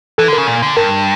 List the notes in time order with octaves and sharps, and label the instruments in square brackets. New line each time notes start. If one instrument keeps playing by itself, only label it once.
[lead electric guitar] E3 [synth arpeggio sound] A4
[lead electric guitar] D3
[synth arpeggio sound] A#4
[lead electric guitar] C#3
A#2
D3
[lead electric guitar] G2 [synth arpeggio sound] A#4